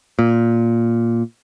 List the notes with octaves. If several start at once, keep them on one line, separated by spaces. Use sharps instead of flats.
A#2